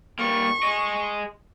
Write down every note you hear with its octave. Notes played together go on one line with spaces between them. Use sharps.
G3 A#3 C#6
G#4 D#5